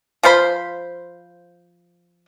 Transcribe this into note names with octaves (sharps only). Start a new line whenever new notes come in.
F3 F4 C5 B5